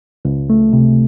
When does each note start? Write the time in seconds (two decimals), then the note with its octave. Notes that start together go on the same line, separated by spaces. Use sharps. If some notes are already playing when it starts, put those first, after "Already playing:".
0.25 C#2
0.50 A3
0.73 C3